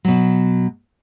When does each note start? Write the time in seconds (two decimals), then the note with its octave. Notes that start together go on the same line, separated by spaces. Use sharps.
0.05 B2 F#3